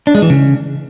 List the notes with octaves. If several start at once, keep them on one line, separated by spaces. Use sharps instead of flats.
D4
G#3
E3
C#3